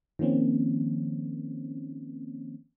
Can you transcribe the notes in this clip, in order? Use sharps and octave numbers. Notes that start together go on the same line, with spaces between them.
D#3 F3 A#3 C4 C#4